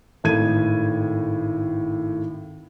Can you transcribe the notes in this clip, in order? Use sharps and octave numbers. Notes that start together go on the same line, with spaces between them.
G#1 A2 G#6 D#7